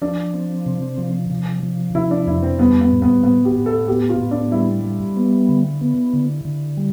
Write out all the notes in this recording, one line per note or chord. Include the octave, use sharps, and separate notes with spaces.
F3 D4
C4
C3
F3
C3
F3
C3 E4
D4
F2 E4
C4
G3 B3
B3
A2
B3
A2 B3
G4
A2
A4
B3 G4
F4
A2
D4
G3 E4
G3
B3
D3
B3
D3
D3
G3